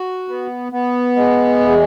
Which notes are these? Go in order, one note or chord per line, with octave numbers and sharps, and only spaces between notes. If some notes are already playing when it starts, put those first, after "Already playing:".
Already playing: F#4
B3
B3
G#3
E2